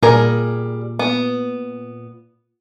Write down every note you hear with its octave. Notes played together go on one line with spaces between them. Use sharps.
A#2 G3 G#4 A#4
B3